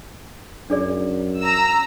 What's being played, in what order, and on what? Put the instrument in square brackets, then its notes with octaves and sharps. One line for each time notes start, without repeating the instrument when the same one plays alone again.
[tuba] F#2 [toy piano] D4 G#4 D5
[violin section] A#5 E6